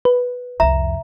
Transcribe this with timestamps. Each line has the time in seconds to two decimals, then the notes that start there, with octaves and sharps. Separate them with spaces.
0.05 B4
0.60 C2 F2 E5 A#5